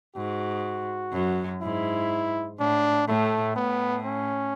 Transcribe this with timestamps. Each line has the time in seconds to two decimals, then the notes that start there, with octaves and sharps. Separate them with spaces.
0.16 G#2 F#4
1.13 F#2
1.62 G#2 E4
2.59 A2 D4
3.08 A2 A3
3.56 A2 B3
4.05 C#4